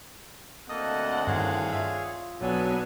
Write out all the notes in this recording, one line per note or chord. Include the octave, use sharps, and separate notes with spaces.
D2 A#3 C4 A4 D#5 F#5 D#6
G2 D#3 E4 G#4 C#5 F5
F4 E5
B1 F#3 B3 D4 A4 G#5